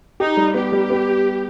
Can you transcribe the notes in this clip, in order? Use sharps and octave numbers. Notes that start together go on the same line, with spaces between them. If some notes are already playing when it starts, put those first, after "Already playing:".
D#4 G4
G3
B3 G4
G3
B3